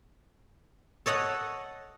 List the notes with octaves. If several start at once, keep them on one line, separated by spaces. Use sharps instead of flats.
A4 C#5 D#5 F#5